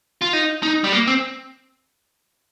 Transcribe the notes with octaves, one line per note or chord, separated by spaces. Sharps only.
F4
D#4
D#4
G3
A#3
C4